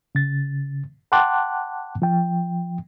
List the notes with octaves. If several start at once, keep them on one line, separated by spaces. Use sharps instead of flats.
C#3 A6
F#5 G5 A5 C6 D6 F#6
F3 G5